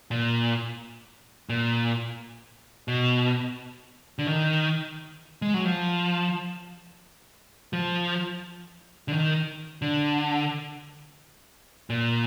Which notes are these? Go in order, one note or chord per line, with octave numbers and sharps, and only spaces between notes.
A#2
A#2
B2
D3
D#3
G#3
F#3
F3
F3
D3
D#3
D3
A#2